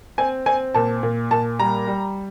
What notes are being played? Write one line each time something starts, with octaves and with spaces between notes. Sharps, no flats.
C4 G#5
C4 G#5
A#2 A5
A#2
A#2 A5
G3 A#5
G3